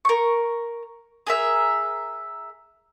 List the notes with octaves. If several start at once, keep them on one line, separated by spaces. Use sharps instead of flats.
A#4 C#6
G#4 A#4 E5